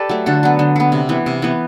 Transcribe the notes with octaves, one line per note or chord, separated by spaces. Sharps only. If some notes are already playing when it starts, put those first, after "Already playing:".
Already playing: G4 A4 B4 D5
F#3 A3
D3 F#4 A4
F#3 B3
D3
F#3 B3
C3
E3 B3
C3
E3 B3